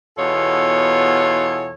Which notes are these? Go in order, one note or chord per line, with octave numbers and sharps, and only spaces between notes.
E2 B2 F4 A4 C#5